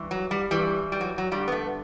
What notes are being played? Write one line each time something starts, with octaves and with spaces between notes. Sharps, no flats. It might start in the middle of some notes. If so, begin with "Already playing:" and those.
Already playing: G2 E3
F#3
G3
G2 E3 G3
G3
F#3
F#3
G2 D3 G3
B3
A3